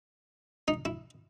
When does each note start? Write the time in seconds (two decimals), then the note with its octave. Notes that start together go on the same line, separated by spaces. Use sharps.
0.68 D#4
0.85 E4